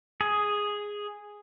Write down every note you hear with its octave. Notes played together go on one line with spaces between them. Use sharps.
G#4